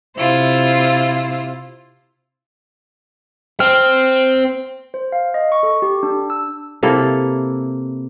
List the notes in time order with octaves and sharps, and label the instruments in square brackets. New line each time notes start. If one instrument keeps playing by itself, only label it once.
[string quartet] C3 E4 F4 C5
[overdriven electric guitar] C4 [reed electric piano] F6
[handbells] C5
F5
D#5
C#6
A4
G4
D4
E6
[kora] C3 A#3 E4 A4